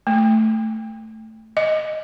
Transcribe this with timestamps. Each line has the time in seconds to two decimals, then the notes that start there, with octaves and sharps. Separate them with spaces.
0.07 A3
1.57 D#5